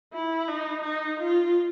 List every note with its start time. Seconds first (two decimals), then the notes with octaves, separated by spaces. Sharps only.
0.14 E4
0.48 D#4
0.84 D#4
1.20 F4